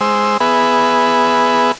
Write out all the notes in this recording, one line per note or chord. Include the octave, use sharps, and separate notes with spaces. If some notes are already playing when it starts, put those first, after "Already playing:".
G#3 C5 E6
B3 G#4 B4 E5